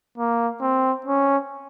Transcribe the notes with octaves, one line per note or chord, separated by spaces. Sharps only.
A#3
C4
C#4